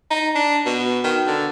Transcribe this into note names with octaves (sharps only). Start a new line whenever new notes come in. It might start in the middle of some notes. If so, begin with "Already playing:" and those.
D#4
D4
B2
D#3
D3